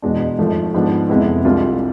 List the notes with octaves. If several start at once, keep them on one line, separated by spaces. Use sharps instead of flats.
E2 B2 G#3 D4
G#1 G#2 F3 A3
G#2 F3 G#3 B3 D4
F2 C3 G#3 B3 E4
C2 C3 G#3 D4 F4